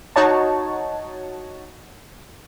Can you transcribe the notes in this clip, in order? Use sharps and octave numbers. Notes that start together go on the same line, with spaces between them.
D#4 F#4 C#5 A5